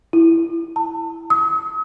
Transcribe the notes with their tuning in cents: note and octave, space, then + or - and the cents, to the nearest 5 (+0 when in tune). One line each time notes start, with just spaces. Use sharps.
E4 +5
A5 +35
D#6 +45